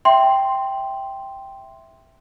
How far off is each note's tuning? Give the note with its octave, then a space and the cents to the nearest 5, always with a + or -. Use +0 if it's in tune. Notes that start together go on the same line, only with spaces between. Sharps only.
E5 +0 G5 +0 C6 +0